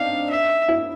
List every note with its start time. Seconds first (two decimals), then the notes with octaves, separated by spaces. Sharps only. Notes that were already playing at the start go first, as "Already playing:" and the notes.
Already playing: C4 D4 D#4 F5
0.30 E5
0.68 E4